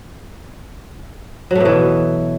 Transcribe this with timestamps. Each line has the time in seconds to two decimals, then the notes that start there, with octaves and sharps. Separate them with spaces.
1.51 F#3
1.56 A3
1.60 B2
1.65 E3